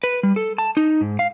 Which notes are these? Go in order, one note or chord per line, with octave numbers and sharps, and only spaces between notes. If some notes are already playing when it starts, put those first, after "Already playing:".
B4
G3
A4
A5
D#4
G#2
F5